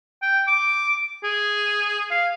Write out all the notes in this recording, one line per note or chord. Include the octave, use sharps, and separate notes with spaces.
G5
D6
G#4
F5